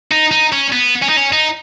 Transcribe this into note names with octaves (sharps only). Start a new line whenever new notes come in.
D#4
D#4
C#4
B3
C#4
D#4
C#4
D#4